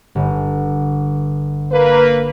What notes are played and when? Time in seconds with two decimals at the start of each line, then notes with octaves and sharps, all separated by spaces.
0.15 G1
1.72 A#3 B4